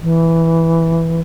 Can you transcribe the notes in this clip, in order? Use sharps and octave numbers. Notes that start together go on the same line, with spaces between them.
E3